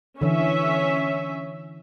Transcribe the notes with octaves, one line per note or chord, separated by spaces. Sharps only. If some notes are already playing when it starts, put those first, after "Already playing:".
D3 E3 C#4 E5